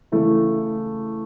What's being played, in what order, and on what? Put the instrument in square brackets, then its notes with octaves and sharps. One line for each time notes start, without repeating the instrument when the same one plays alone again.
[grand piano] C#3 E3 A3 E4 G#4